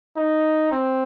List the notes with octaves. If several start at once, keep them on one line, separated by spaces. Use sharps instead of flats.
D#4
C4